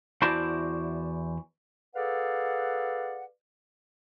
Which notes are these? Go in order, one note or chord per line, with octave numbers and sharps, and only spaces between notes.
E2 E4 F#4 C5 D5 A5
G#4 A4 B4 D5 F5 F#5